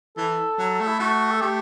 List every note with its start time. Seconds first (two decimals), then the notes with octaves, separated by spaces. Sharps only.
0.17 E3 A4
0.58 F#3
0.80 A3
0.88 E4
1.00 A3 F#4
1.31 A4
1.42 A3 G4